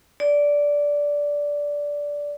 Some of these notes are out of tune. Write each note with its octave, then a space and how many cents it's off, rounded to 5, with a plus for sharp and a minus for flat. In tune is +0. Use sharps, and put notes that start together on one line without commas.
D5 -10